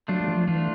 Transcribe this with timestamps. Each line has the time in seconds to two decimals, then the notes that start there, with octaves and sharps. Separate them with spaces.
0.08 F#3 A3 D4 F4
0.24 F#3
0.28 F3
0.47 E3 A3 D4 F4